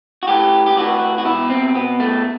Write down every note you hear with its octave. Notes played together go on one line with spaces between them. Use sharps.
F#4
A2 E3 G4
G4
A2 E3 F#4
F#4
B2 E4
C4
B2 B3
A3